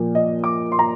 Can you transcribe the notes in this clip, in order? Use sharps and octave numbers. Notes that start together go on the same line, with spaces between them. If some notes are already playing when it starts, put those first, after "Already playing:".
Already playing: A#2 F3 A#3
D#5
D6
C6
A#5